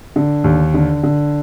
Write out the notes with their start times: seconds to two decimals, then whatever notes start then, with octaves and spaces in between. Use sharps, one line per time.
0.16 D3
0.44 D#2
0.74 D3
1.03 D3